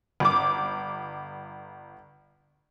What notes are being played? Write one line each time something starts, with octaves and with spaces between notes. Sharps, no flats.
G1 D6